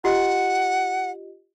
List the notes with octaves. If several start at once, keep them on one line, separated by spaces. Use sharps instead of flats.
F4 G4 D#5 F#5